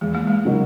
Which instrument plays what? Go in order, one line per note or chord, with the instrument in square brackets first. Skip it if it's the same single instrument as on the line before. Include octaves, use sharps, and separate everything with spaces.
[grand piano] E2 [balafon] G#3
[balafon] A#3
G#3
[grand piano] C#3 F#3 A#3 D#4